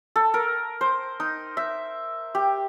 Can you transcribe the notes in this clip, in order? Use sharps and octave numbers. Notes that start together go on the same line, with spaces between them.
A4
A#4
C5
D#4
E5
G4